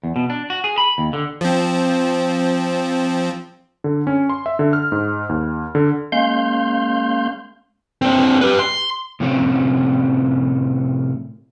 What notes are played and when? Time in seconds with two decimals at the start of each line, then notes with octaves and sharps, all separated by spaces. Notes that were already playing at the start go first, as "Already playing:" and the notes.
0.04 E2
0.16 B2
0.30 D4
0.50 F#4
0.64 G#4
0.78 B5
0.98 D#2
1.13 D3
1.41 F3 C4
3.84 D3
4.07 C#4
4.29 C6
4.46 E5
4.59 D3
4.73 F6
4.92 G#2
5.29 D#2
5.75 D3
6.12 G#3 A#3 C#4 F5 C6 G6
8.02 C4 D4
8.41 G4 B4
8.59 C6
9.20 A2 C3 F3 A3 C4 C#4